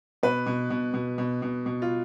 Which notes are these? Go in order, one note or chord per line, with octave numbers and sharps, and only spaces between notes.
B2 B4
B2
B2
B2
B2
B2
B2
F4